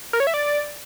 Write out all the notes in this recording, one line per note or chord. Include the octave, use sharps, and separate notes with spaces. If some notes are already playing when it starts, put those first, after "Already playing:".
A#4
C#5
E5
D5